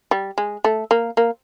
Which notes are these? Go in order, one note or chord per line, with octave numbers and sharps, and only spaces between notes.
G3
G#3
A3
A#3
A#3